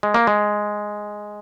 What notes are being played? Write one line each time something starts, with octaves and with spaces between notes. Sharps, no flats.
G#3
A#3
G#3